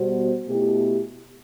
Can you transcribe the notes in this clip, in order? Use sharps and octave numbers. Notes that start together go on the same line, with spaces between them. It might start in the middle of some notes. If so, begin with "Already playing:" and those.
Already playing: B2 G3 B3 F#4 C5
B2 A3 E4 G4